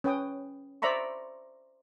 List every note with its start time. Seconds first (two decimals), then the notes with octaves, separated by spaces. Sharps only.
0.04 C#4 B4 G5 D#6
0.82 C5 D5 E5 A#5 B5 C#6